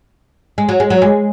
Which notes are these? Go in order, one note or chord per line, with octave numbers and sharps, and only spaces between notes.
G#3
F#3
G#3
F#3
G#3